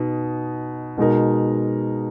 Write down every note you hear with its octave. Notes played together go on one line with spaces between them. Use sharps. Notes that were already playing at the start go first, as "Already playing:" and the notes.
Already playing: B2 D#4
B2 G#3 D#4 A#4